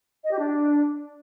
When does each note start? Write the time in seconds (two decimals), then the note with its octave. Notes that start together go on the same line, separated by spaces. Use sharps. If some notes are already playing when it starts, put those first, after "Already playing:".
0.24 D#5
0.31 G4
0.38 D4